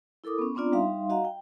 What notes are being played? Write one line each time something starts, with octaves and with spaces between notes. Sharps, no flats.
E4 A4 A#4 D6 D#6
B3 C#4
B3 C4 D4 F4 D5 A#5
G3 D#4 E5 F5 C6
F#4 D#5 F5 F#5 A#5
G5